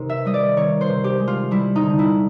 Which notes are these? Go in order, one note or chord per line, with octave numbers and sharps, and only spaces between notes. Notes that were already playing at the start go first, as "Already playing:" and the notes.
Already playing: C3 D#3
E5
G3 D#5
D5
D#3 C#5
C5
C3
G4
G#3
F4
G3 E4
D#4
D3
E4